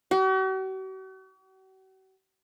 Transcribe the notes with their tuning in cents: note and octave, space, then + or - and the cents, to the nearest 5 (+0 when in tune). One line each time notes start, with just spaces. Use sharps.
F#4 +45